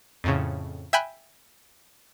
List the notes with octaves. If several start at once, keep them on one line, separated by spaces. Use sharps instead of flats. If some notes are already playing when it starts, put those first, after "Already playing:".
F2 A2 C#3
E5 G5 G#5 B5 F#6